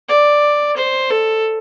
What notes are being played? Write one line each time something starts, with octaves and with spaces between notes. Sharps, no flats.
D5
C5
A4